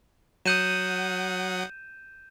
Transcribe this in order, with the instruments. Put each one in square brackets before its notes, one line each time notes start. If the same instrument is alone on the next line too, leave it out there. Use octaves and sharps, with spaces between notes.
[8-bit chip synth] F#3 F#5 D#6 [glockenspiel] G6 D#7 E7